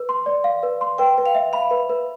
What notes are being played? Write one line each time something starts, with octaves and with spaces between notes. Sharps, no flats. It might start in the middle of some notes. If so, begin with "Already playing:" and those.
Already playing: B4
C6
D5
F5
B4
C6
B4 G5
B4
F5
E5
F5 B5
B4
B4